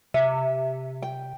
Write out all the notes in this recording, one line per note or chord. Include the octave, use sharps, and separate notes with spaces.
C3 E5
G5